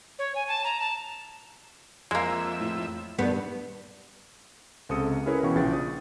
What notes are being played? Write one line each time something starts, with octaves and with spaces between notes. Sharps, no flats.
C#5
G#5
A5
A#5
A5
F2 G#3 A#3 E5
A2
G2 D#3 G3 B3 D4
C#2 C3 A4 D#6 C#7
C#4 E4 G#4 A#4 B4 C#5
B2 E3 C#4 F5 G5 C#6
A#1 C#3 F4 G5 C#6 A6
D#6